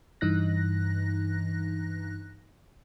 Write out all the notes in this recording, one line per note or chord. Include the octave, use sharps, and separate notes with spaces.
G2 E3 D#4 F#6 A#6